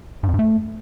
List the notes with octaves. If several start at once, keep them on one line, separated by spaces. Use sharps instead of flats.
G2
F2
G2
A3